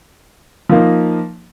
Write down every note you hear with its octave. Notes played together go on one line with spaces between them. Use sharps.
F3 A#3 D#4